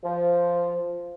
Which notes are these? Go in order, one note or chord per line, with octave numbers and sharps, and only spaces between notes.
F3